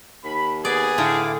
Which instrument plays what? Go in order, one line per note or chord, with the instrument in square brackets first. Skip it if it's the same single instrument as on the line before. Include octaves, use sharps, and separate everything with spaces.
[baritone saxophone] D#2 [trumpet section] B5
[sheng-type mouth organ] B3 B4 [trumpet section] G#4 [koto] D5
[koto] A2 D3 [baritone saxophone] A3 [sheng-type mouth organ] E4 F5 D6